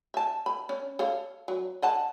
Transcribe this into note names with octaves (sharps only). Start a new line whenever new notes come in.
E5 A5
B5
C#4
A4 C#5 F5
F#3
D#5 F#5 A5